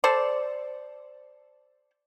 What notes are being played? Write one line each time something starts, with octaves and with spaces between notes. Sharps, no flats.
A4 C5 D5